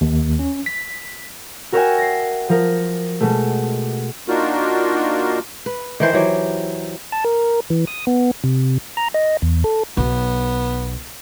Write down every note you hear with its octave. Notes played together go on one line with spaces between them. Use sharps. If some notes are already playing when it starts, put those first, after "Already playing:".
D#2
C#4
B6
F#4 A#4 C#5 E5 G5 G#5
A#6 C7
F3 A#4
B2 G#3 A3
A#3 D4 D#4 F4 F#4 A#4
B4
D#3 E3 C5
E3 F#3 G4
A5
A#4
E3
D#6
B3
C3
A#5
D#5
E2
A4
B1 B3